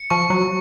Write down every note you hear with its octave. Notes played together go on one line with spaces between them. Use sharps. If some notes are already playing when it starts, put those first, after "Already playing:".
Already playing: C#7
F3 C#6
F#3